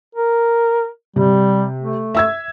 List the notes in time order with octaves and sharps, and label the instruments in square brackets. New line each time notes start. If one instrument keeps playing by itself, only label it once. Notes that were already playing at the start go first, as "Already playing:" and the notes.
[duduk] A#4
[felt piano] C3 [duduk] G3
[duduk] A3
[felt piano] E5 E6 G#6